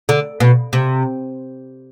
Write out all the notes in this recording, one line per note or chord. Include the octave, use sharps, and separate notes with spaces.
D3
B2
C3